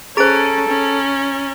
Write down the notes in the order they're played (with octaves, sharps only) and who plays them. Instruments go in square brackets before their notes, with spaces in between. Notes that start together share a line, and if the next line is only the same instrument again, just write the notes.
[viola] C#4 [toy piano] G#4 C5 [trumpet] A4 [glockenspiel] A#5 A6 D7
[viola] C#4